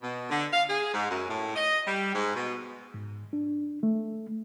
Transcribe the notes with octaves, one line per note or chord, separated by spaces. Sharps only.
B2
D3
F5
G#4
G#2
F#2
A2
D#5
G3
G#2
B2
G#2
D4
A3